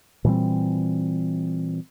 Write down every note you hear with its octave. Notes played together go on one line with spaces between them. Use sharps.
A#2 E3 G3 C4